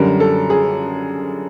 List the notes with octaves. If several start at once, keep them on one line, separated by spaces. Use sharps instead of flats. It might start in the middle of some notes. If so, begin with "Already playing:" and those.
Already playing: F#2 D3 G3 A#4
A4
G#4